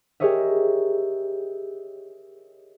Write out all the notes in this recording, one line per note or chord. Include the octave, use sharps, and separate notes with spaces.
G4 G#4 A#4 C#5 D#5 E5